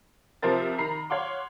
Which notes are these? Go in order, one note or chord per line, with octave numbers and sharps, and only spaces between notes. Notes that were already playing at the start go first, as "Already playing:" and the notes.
C3 F3 A#4 C5 A6
D#3 A#5 B5 C7
C#5 F5 F#5 C6 D6